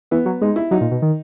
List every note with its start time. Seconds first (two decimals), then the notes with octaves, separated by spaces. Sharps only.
0.11 E3 B3
0.26 F#3
0.41 G#3 D#4
0.56 E4
0.71 F#3 D#4
0.81 A#2
0.91 B2
1.02 D#3